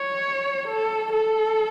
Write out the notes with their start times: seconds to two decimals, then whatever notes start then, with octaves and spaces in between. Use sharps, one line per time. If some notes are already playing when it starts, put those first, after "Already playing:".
Already playing: C#5
0.68 A4
1.13 A4